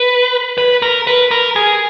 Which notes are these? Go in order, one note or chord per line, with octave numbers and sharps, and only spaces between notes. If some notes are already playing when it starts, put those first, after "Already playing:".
Already playing: B4
B4
A#4
B4
A#4
G#4